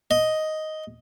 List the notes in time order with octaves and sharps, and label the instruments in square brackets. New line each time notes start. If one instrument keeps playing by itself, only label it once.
[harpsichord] D#5